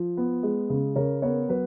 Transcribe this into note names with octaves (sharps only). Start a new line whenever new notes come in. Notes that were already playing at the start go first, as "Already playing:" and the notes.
Already playing: F3
B3
G#3
C#3
C#3 A#4 C#5
B3 A#4 C#5
F#3 B4